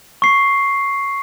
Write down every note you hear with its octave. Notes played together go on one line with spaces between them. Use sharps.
C#6 C7